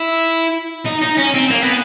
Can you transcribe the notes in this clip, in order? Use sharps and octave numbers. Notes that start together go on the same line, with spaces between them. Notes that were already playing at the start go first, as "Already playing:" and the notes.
Already playing: E4
D#4
D#4
C#4
C4
A#3
B3